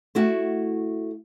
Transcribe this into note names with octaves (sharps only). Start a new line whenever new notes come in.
A3 E4 F#4